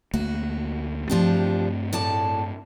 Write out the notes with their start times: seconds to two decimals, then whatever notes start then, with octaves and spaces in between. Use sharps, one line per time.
0.14 D2 A3 A#3 F#4
1.10 G2 F3 A3 C4 D4 G4
1.93 A2 D5 A5